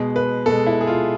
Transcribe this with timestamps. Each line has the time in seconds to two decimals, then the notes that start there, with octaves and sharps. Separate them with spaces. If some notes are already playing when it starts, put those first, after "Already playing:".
Already playing: B2 G#3
0.16 B4
0.46 B2 A4
0.50 G#3
0.67 E4
0.81 G#4
0.87 F4